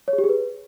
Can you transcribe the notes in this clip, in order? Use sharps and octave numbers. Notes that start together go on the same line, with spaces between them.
C#5
G#4
G4
G#4
B4